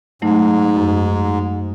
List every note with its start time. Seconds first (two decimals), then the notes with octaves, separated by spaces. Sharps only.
0.22 G#2 F#3 A3 D#4
0.76 F#2